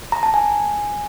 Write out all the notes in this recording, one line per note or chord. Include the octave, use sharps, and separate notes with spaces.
A#5
A5
G#5